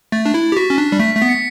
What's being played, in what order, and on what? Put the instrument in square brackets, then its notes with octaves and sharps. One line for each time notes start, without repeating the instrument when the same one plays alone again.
[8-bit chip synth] A3 [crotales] A6
[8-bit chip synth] D4
E4
G4
[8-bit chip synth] F#4 [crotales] B6
[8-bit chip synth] C#4
D4
G3
[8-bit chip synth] A3 [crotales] B6
[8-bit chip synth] A3
[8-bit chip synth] B3 [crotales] B6
[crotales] C#7